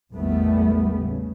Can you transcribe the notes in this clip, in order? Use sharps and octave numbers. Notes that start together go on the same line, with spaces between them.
A1 E2 D#3 G3 A3 B3
C#3